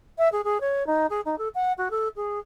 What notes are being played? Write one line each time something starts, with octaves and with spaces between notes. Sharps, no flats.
E5
G#4
G#4
C#5
D#4
G#4
D#4
A4
F#5
F#4
A4
G#4